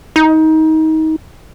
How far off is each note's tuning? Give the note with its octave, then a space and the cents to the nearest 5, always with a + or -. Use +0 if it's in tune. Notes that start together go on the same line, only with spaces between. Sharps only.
D#4 +25